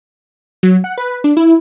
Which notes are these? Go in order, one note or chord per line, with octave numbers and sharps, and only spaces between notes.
F#3
F#5
B4
D4
E4